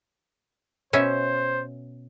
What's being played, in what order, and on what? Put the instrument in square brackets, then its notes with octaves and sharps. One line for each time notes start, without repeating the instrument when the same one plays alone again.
[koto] B2 C#4 E5 [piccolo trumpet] C5